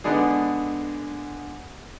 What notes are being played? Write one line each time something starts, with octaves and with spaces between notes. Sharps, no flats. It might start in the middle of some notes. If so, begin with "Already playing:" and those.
D3 G#3 B3 D4 G#4